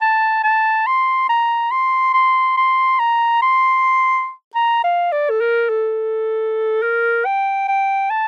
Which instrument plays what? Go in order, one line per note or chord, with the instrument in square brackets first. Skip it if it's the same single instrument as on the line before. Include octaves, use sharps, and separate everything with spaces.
[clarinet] A5
A5
C6
A#5
C6
C6
C6
A#5
C6
A#5
F5
D5
A4
A#4
A4
A#4
G5
G5
A5